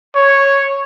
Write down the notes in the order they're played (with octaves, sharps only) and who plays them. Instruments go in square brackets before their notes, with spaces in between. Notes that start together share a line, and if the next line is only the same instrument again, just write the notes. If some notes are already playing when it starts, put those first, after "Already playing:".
[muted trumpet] C#5